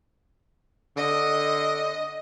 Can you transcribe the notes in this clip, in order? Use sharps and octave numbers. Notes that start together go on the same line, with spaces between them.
D3 D#5